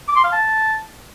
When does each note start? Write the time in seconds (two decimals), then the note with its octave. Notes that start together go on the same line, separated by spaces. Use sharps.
0.08 D6
0.16 C6
0.24 F5
0.32 A5